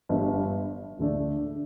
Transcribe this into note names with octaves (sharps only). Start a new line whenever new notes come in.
G1 G2 G3
D2 D3 A3 D4